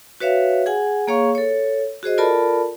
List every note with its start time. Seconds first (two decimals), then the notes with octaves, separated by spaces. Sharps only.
0.20 F#4 B4 C#5 E5 F5
0.66 G#4 F#5 G#5
1.07 A#3 G#4 C#5 F5 C#6
1.35 A4 C#5
2.03 F#4 G#4 C5 D#5
2.18 F4 A4 A#4 D5 A5 B5